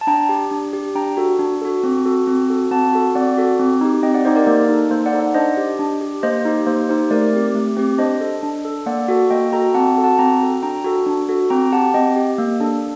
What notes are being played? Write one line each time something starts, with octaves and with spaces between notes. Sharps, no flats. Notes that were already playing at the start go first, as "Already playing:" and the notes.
A5
D4 G5 A#5
G4
D4
G4
D4 G5 A#5
F#4 A4
D4
F#4 A4
C4
F#4 A4
C4
F#4 A4
C4 F#5 A5
F#4 A4
C4 D5 F#5
F#4 A4
C4
D#4 G4
C4 D#5 G5
D5 F#5
D#4 G4 C5 D#5
A#4 D5
A#3 A#4
D#4 A4
A#3 C5
D5 F#5
D#4 A4
D5 F#5
D4 C5 D#5
G4
D4
G4
A#3 C5 D#5
D#4 G4
A#3 C5
D#4 G4 C5
A3 A#4 D5
C4 G4
A3
C4 G4
D4 C5 D#5
A4
D4
A4
A#3 D5 F#5
F#4 A4
A#3 D#5 G5
F#4 A4 G5 A#5
C4 F#5 A5
F#4 A4
F#5 A5
C4 G5 A#5
F#4 A4
D4 G5 A#5
F#4 A4
D4
F#4 A4
C4 G5 A#5
G4 F#5 A5
C4 D#5 G5
G4
A#3
D4 A4